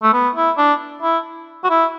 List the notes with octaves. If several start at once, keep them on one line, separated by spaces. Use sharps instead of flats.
A3
B3
E4
D4
E4
F#4
E4